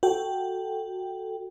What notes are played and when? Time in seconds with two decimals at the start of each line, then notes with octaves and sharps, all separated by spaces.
0.03 F#4 A4 G5